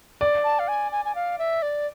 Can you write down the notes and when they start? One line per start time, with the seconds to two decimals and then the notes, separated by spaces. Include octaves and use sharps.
0.21 D5
0.44 A5
0.59 F5
0.68 G#5
0.92 G#5
1.05 G#5
1.15 F5
1.39 E5
1.62 D5